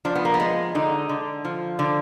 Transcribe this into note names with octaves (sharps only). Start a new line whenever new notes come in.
F3 D4
B3
A#3
B3
G#3
D3 D#4
D3
F3
D3